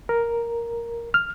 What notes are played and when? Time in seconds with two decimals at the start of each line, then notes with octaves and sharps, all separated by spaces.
0.09 A#4
1.14 F6